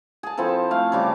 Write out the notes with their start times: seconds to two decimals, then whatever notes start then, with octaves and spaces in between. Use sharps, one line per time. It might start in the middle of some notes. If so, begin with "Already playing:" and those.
0.23 G#4 A5
0.37 F3 C4 E4 A4
0.71 A3 F5
0.92 C#3 G3 D6